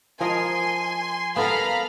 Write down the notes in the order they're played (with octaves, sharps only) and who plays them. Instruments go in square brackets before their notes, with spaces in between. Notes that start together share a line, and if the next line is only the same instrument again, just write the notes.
[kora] F3 A#4 D#5 [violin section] G#5 C6
[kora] B3 A4 A#4 [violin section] F5 A#5 B5